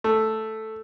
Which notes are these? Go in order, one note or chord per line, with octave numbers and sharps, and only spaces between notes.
A3